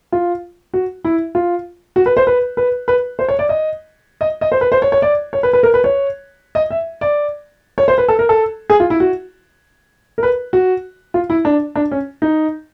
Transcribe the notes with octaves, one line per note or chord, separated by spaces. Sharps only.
F4
F#4
E4
F4
F#4
B4
C5
B4
B4
B4
C5
C#5
D5
D#5
D#5
D#5
C5
B4
C5
C#5
C#5
D5
C#5
B4
B4
A#4
B4
C#5
D#5
E5
D5
C#5
C5
B4
A4
A#4
A4
G#4
F4
E4
F#4
A#4
B4
F#4
F4
E4
D4
D4
C#4
D#4